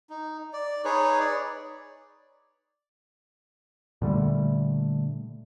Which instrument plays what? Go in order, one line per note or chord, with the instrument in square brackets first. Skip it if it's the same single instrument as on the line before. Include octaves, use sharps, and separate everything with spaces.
[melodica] D#4
D5
D#4 G#4 B4 C#5
D5
[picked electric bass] A#2 D3 G3 A3